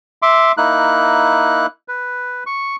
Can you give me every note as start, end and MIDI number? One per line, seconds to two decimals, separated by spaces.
0.22 0.52 76
0.22 0.52 84
0.22 0.52 86
0.57 1.66 58
0.57 1.66 63
0.57 1.66 64
0.57 1.66 90
1.88 2.44 71
2.46 2.76 85